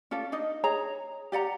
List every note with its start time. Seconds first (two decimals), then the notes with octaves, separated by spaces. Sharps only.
0.11 C#4 F4 A4 D5
0.32 D4 D#4 D#5
0.64 G#4 C#5 A#5
1.32 G4 D5 F#5 A#5